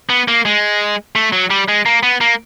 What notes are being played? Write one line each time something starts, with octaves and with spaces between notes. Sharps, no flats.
B3
A#3
G#3
A3
F#3
G3
G#3
A#3
B3
A#3